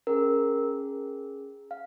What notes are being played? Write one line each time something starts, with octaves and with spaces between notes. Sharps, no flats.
C#4 G#4 A#4
F5